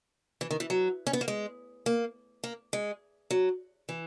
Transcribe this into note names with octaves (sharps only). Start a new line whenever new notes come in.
E3
D#3
E3
F#3
C#4
B3
A#3
G#3
A#3
A#3
G#3
F#3
E3